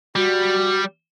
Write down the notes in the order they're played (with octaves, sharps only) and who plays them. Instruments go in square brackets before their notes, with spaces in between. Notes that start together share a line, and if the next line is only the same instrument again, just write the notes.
[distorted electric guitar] G3 [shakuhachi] F#4